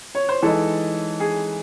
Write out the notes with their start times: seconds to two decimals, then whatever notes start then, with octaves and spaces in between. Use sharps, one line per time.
0.15 C#5
0.29 C5
0.42 E3 G#3 D#4 A4
1.20 G#4